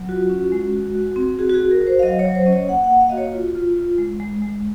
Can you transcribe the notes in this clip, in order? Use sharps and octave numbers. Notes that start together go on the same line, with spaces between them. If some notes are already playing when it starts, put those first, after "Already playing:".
Already playing: F#3
F4 F#4
C#4
G#3
F#4
F#4
C4
F#4 G#4
F#4
G#4
F#4
A#4
F#4
C5
F5
F#3 D#5
C#5
F#3
C5
C#4 D#5
C#5
A#3 F#5
F#5
A#3
F5
F#4 D#5
C#5
F4
F4
F4
G#3
G#3
G#3